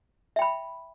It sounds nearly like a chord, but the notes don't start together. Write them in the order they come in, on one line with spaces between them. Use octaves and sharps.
E5 G5 B5